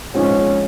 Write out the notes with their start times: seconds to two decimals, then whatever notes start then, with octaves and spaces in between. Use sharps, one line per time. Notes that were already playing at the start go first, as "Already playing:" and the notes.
0.14 A#1 G#2 F3 C4 C#4 D#4